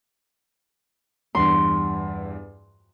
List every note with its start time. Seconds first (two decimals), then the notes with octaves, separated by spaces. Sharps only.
1.35 E2 G2 G3 C6